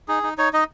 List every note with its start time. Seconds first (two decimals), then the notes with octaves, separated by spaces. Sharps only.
0.08 D#4 G#4
0.23 D#4
0.38 D#4 C#5
0.53 D#4 D#5